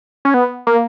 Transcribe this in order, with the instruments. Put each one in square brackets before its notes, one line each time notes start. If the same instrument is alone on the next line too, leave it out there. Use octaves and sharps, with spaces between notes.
[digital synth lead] C#4
B3
A#3